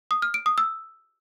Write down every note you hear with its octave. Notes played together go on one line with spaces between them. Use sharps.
D#6
F6
D7
D#6
E6